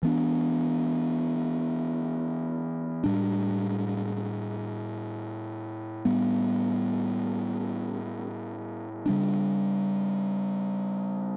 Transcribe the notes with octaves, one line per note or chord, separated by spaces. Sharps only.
E3 B3 D4
A2 G3 D4
A2 G3 B3
C#3 G3 B3 D4